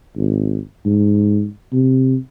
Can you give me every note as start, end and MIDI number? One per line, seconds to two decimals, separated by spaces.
0.17 0.59 32
0.86 1.47 44
1.72 2.16 48